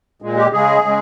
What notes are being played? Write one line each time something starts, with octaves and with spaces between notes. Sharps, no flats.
A#2 G#3
G4
C#3 G#3 G#4
C#3 G#3